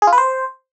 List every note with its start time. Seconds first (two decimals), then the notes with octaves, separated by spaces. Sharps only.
0.02 G#4
0.07 F4
0.13 B4
0.18 C5